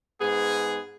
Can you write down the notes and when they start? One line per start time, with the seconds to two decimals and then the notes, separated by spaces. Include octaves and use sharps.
0.21 G#2 B3 G#4